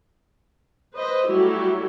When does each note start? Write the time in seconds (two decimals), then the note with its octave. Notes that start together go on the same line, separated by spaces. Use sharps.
0.94 B4 C5 D#5
1.28 F#3 G3 A3 E4 F#4 G4